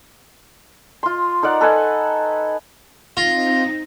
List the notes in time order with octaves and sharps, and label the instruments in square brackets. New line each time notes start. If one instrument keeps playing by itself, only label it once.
[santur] F4 C6
D#4 A#4 D5 F#5
A4 B4 D#5 G#5
[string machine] C4 D#4 [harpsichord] F4 [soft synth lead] A#6